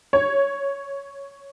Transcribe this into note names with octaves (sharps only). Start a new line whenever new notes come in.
C#5